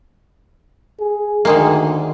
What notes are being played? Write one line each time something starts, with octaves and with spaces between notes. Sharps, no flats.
G#4
D2 D#3 G#3 A#3